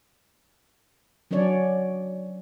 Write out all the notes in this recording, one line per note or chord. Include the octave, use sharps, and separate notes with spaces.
F#3 C#4 D4 C#5 D5